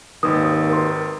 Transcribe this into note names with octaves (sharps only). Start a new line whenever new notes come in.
G#1 D#2 D#3 B4 D#6
A#4 B4 C6